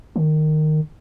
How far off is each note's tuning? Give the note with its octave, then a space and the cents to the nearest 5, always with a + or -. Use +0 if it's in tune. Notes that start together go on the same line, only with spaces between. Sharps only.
D#3 -15